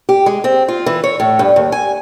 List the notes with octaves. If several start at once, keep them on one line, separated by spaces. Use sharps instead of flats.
G4
G#3
C4
F4
E3
C#5
A2
G2
D#2
G#5